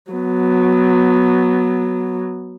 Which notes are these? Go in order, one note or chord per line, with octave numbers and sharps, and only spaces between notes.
F#3 B3